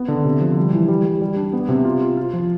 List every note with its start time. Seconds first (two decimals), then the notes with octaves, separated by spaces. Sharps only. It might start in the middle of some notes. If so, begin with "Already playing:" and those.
Already playing: B3
0.08 D3
0.25 C3
0.41 F3
0.58 G3
0.73 E3
0.88 G3
1.05 G3
1.22 G3
1.37 D4
1.53 B3
1.69 C3
1.85 F4
2.01 F4
2.17 F4
2.33 F3